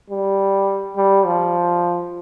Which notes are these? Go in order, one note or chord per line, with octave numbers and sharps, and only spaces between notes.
G3
G3
F3